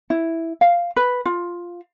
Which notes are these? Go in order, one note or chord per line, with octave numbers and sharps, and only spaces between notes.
E4
F5
B4
F4